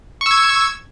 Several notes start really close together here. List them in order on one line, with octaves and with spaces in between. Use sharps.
C#6 E6 G#6